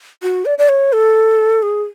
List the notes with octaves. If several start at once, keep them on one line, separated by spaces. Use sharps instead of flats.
F#4
D5
D5
C#5
A4
G#4